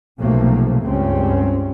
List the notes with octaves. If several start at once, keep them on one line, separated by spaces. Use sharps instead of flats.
B1 C3 F3 A3 A#3
C#2 G2 G3 C4 C#4